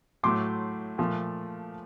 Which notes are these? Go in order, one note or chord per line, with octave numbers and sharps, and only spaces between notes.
A2 F#3 A3 C6 D6
A#2 F3 A3